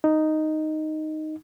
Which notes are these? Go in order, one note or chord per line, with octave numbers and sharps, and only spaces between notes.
D#4